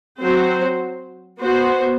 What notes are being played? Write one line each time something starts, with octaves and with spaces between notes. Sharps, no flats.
F#3 C4 F#4 C5
B3 F#4 C5